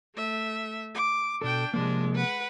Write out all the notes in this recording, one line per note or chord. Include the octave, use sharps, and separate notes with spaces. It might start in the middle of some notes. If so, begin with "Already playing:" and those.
A3 E5
D6
B2 D4 A4 G5
C3 F3 G#3 A#3 D4
B4 F#5